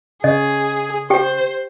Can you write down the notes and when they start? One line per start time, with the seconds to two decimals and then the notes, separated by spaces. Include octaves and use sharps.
0.24 C#3 G#4 D#5
1.10 G4 C5 G5